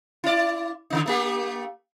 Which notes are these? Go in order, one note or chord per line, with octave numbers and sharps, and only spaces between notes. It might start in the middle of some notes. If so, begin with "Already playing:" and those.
E4 D5
D3 D#3 D#4
A3 A#3 G4